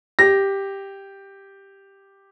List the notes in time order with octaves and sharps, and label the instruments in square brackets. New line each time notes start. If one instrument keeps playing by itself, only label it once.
[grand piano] G4 A#6